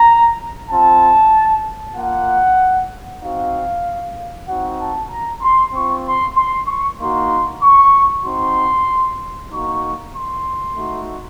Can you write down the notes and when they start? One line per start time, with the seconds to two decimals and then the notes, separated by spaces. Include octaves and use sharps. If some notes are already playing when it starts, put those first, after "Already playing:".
Already playing: A#5
0.69 C4 F4 A5
1.95 A#3 F4 F#5
3.21 C4 D#4 F#4 F5
4.47 C4 D#4 F#4 F#5
4.78 A5
5.09 A#5
5.41 C6
5.73 C4 F4 C#6
6.04 C6
6.35 C6
6.67 C#6
6.98 A#3 D#4 F#4 C6
7.61 C#6
8.24 C4 D#4 F#4 C6
9.50 A#3 D#4 F#4 C#6
10.13 C6
10.76 A3 D#4 F#4